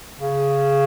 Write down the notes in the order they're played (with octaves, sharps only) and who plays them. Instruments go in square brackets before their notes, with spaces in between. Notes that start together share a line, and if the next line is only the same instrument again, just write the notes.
[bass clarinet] C#3